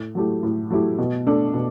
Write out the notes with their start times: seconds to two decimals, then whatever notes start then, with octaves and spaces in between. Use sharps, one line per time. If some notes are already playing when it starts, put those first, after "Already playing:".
Already playing: A2
0.15 F#3 A3 E4 G4
0.43 A2
0.70 F#3 A3 E4 G4
0.98 B2
1.27 A3 D4 A4
1.54 B2